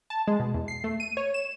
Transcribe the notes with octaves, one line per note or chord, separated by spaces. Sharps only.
A5
G#3
B2
E2
C7
A3
D#7
C#5
E7